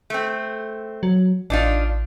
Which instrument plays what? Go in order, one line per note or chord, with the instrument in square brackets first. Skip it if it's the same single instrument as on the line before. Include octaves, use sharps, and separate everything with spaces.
[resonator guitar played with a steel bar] A3 C4
[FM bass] F#3
[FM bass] A1 [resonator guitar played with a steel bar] D4 D#4 F4